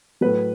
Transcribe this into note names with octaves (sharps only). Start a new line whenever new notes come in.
A2 F#3 B4